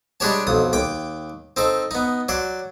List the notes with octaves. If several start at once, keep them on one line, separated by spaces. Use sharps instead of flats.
G3 G#3 D4 G4 C#5 A5
B1 F2 D#6
D#2 G5 D6
C4 D#4 A4
B3 D#4
F#3 D5 C6